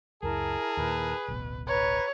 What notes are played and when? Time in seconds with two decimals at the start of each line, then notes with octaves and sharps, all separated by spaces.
0.23 C#2 F#2 E4 G#4 A#4 A5
0.77 D#2 A#2 B4
1.28 D1 A1 B2
1.68 B4 C#5 A#5